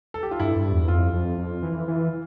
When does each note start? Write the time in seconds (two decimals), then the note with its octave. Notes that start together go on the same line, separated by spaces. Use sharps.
0.14 A4
0.23 G4
0.31 F4
0.40 G2 E4
0.56 G2
0.73 E2
0.88 F2 F4
1.13 F2
1.38 F2
1.63 E3
1.88 E3